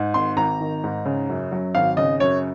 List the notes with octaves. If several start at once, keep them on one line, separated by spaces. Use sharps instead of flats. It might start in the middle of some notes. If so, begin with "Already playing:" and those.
Already playing: G#2
G#1 C6
G#1 A#5
D#3
G#2
C#3
F#2
F#3
G#1 F5
C#3 D#5
F#2 C#5